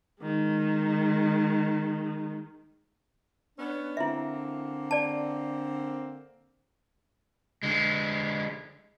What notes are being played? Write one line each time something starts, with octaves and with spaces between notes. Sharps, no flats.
D#3 G#3
B3 C#4 D4
D3 A#3 C4 E4 E5
D5 A5
D3 G#3